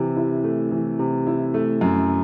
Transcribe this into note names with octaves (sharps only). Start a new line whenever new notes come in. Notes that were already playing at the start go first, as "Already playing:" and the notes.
Already playing: C3 E3
E4
A3
E3
C3
E4
A3
F#2